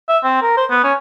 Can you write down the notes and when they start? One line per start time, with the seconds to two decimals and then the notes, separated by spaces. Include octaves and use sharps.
0.09 E5
0.24 C4
0.42 A#4
0.57 C5
0.71 B3
0.84 C#4